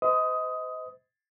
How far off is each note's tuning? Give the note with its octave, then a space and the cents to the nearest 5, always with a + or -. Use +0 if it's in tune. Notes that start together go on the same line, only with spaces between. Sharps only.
C5 -35 D#5 +25 D#6 +10